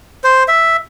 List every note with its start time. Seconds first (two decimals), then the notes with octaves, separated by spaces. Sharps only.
0.24 C5
0.48 E5